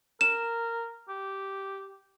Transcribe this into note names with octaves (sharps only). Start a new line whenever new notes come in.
A#4 E7
G4